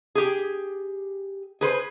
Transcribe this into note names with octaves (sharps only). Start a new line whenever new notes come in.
G4 G#4
G#4 B4 C5